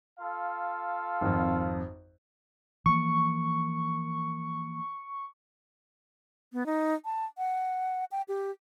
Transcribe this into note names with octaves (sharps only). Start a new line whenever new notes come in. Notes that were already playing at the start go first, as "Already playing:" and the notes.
F4 A4 F5
G#1 F2
E3 F3 A#3 C#6
B3
D#4
A5
F#5
G5
G4